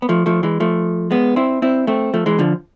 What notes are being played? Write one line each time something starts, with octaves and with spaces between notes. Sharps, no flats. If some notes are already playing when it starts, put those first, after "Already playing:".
B3
F3 A3
F3 A3
E3 G#3
F3 A3
G#3 B3
C4 E4
C4 E4
A3 C4
F3 A3
E3 G#3
D3 F3